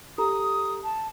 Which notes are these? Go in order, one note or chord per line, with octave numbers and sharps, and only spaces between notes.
G4 A4 A#5 D#6
A5